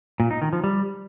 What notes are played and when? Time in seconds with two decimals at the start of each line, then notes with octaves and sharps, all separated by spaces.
0.20 A#2
0.31 D#4
0.42 D#3
0.53 F3
0.64 G3